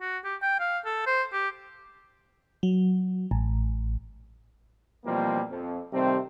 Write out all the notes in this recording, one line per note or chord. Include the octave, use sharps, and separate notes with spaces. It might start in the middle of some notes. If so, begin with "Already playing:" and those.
F#4
G4
G5
F5
A4
C5
G4
F#3
A1
B2 E3 F3 G3 A#3 C4
F2
C3 D#3 G3 A3 C4